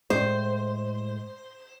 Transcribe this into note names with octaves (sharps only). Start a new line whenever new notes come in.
A2 G#3 C5